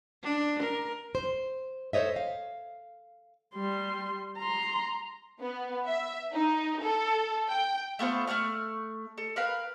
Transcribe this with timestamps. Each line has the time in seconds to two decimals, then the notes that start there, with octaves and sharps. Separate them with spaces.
0.23 D4
0.62 A#4
1.15 C5
1.93 A4 C5 C#5 D#5 E5
2.16 F5
3.56 G3 C6
4.39 A#5 C6
5.41 B3
5.86 E5
6.34 D#4
6.81 A4
7.49 G5
7.99 A3 B3 F4 C5
8.27 A3 G#4 C#6 F6
9.18 A4
9.36 A#4 B4 F5